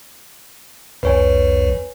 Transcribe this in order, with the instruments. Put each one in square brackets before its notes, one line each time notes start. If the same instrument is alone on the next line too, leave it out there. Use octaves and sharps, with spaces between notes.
[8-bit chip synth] C2 F2 [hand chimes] B4 C#5 G#5